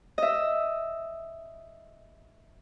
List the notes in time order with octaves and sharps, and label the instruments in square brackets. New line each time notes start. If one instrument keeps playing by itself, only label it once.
[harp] D#5 E5